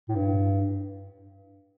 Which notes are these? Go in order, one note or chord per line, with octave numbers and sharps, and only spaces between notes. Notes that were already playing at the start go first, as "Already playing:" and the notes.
A2
G2